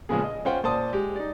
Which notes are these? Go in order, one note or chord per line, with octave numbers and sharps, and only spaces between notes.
A#2 C#3 F3 G#3 B3 G#4
D#5
C#4 F4 C5 F#5 G5
A#2 C5 D5 A5 D#6
G#3 G4
D#4 D5